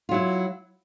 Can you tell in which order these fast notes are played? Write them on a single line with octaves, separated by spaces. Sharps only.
F4 F#3 E4